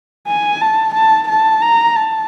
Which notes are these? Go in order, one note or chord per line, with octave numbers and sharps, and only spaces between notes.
G#5
A5
A5
A5
A#5
A5